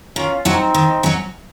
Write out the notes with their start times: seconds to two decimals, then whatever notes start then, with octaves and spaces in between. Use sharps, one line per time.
0.16 D#3 C#4 F4
0.45 F#3 C4 C#4 D#4 F#4
0.74 D#3
1.03 F#3 C#4 F#4